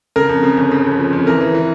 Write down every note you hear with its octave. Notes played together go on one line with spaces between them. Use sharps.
C#3 A#4
F2
C#3
G1
C#3
F2
F3
F2
E3 A#4
E3
E3